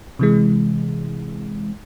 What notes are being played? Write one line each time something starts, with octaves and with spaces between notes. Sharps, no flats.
C3 E3 G#3